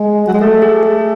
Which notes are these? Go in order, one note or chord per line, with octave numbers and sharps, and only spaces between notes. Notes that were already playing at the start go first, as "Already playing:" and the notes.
Already playing: G#3
F#3
G#3
A3 A4
G#4
G#4